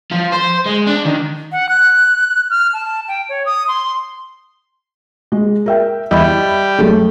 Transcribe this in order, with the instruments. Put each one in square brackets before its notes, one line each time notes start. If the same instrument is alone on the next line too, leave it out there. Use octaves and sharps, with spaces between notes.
[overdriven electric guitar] F3
C5
G#3
D4
D#3
[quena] F#5
F#6
F6
A5
G5
C#5
D#6
C6
[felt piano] G#3
A#4 E5 G5
[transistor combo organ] E2 G3 [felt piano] D#5 E5 B5
[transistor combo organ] G3
[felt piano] F#2 A3